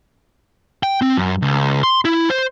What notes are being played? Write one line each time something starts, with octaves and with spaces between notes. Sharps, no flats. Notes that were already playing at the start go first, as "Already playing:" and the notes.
G5
C4
F#2
C#2
C6
E4
C5